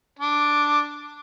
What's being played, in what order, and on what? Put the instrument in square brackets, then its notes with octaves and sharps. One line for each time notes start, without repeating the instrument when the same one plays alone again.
[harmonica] D4